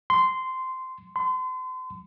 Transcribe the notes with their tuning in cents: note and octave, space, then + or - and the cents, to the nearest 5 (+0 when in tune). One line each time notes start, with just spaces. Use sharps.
C6 -15
C6 -40